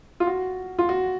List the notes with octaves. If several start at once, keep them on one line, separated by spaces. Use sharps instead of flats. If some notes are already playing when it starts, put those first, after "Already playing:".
F4
F#4
F4
F#4